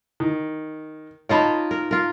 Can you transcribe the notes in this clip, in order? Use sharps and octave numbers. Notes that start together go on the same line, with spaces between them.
D#3
D#4 F4 A#4 C#5 A5 B5
A#4
F4 A#4